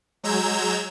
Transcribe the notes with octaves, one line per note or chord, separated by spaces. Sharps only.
F#3 G#3 A#5 E6 G6 G#6